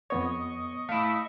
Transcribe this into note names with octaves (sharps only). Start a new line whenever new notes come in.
F2 B3 C#5 D#5 C#6
A3 E4 F5